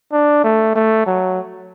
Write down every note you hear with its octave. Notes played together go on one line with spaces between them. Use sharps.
D4
A3
A3
F#3